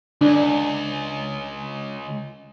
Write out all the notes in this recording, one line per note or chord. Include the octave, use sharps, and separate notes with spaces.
C#2 D4